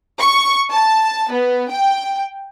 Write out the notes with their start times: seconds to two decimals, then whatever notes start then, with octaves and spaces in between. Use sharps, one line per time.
0.20 C#6
0.70 A5
1.31 B3
1.71 G5